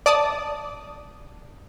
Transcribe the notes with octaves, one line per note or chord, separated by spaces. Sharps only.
D5 A5 D#6